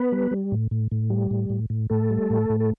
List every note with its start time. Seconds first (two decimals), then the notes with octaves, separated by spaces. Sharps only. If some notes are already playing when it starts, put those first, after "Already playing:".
Already playing: B3 B4
0.12 G3
0.31 G3
0.52 A2
0.71 A2
0.92 A2
1.10 G3
1.31 A2
1.50 A2
1.70 A2
1.90 A2 A3 A4
2.11 G3
2.30 A2
2.50 A2
2.60 A4